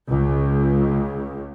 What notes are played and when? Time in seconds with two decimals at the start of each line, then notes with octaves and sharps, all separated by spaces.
0.10 C#2